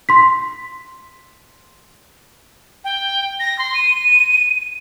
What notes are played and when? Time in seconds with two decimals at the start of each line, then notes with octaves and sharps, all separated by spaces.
0.09 C6 B6
2.84 G5
3.39 A#6
3.58 C6
3.74 D#7